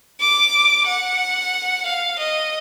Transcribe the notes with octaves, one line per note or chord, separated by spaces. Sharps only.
D6
F#5
F5
D#5